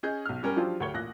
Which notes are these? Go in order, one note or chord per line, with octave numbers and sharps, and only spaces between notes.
C#4 G#4 D#5 G6
B1 F6
G3 C#4 A#4
F3 F#3 D4 F4 G4 C5
D2 G4 C#5 G7
A1 A#2 F#6 A#6